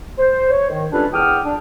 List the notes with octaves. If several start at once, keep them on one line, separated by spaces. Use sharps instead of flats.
C5
C#5
D#3
G3 C#4 D4 F4 A4 B4
E2 F#5 G5 D6 D#6 F6
D4